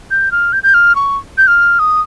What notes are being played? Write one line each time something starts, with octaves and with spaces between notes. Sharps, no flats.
G6
F6
G6
G6
F6
C#6
G6
F6
D#6